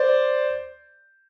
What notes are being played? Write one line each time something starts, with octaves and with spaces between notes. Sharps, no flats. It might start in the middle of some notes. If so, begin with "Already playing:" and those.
Already playing: C5 D5